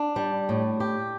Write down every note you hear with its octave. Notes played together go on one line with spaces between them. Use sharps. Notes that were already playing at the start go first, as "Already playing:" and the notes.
Already playing: D4
G3
A2
G4